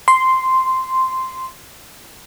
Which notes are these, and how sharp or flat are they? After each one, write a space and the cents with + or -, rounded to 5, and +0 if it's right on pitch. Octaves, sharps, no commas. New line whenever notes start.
C6 -5